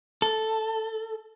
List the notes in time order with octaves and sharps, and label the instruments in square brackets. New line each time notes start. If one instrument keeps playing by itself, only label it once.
[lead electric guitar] A4